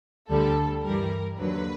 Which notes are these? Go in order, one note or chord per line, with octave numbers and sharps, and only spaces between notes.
D2 D3 G3 A4
G2 E3 G3 A#4
D#2 D3 F#3 B4